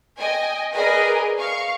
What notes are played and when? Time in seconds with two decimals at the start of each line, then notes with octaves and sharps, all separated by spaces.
0.18 D#5 G5 G#5
0.73 G#4 A#4 B4 D5 D#5 G#5
1.38 F5 C#6